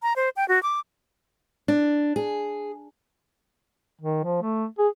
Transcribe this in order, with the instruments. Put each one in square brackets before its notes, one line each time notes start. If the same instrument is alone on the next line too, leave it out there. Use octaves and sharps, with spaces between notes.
[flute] A#5
C5
G5
F#4
D6
[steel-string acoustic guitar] D4
G#4
[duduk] D#3
F3
A3
G#4